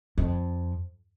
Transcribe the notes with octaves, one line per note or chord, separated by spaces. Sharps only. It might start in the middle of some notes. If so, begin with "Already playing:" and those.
F2